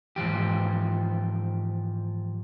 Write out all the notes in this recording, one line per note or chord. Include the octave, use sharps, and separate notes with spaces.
G#2 E3 F3 G4